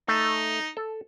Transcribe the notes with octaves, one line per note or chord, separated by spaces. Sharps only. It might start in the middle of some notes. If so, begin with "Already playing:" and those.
A3 D#4
A4